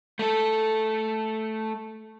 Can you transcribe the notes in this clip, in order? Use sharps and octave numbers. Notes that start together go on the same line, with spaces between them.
A3 A4